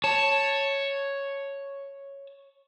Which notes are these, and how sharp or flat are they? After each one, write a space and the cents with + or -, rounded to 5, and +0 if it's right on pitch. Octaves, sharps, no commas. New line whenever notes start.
C#5 +0 A5 +0